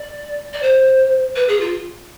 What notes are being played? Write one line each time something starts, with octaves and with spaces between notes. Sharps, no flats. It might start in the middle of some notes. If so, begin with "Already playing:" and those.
Already playing: D5
D5
C5
B4
G#4
F4